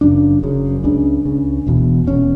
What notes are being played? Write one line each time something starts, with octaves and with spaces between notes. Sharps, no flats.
F#1 F#2 C#3 D4
F#1 F#2 C#3
C#2 C#3 D4
C#2 C#3
E1 E2 B2
E1 E2 B2 C#4